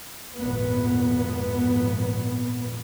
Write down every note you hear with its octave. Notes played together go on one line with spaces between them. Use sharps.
G#1 F2 A#2 B3